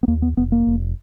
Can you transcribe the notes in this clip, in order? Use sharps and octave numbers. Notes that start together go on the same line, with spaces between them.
B3
D#2 A#3
B3
F1 B3
A#3
F1